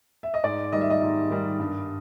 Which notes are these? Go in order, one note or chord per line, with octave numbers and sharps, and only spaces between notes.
E5
D#5
G#2 D5
D#3 G3 D#5
E5
D#5
G#2
D#3 G3
G2